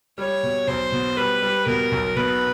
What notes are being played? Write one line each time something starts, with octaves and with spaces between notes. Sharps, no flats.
G3 C#5
B2
B1 C5
B2
G3 B4
G3
B2 A#4
B1
B2 B4